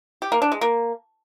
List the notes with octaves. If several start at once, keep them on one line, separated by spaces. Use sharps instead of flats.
G4
A#3
D4
G#3
A#3